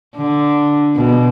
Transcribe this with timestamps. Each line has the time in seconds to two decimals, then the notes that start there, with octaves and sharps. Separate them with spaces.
0.16 D3
0.96 B2